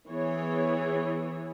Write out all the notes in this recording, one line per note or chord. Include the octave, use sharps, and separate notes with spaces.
E3 B3 G#4 C#5